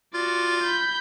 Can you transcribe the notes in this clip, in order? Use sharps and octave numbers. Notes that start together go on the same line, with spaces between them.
F4 F#4 D5
B5 G6